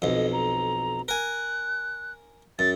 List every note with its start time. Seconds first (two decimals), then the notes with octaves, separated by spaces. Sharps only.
0.02 B1 F2 D#5
0.33 A#5
1.08 A#4 G#5 F#6
2.59 F#2 A6